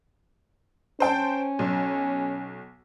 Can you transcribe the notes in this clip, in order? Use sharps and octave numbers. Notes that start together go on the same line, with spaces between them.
C#4 C5 G5 A5
B1